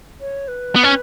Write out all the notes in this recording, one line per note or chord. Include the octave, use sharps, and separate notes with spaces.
C#5
B4
B3
C#4